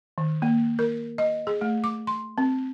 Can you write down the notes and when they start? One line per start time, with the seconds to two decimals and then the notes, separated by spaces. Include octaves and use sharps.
0.18 D#3
0.42 A#3
0.79 A#4
1.18 D#5
1.47 G#4
1.61 A3
1.84 D6
2.07 C6
2.38 C4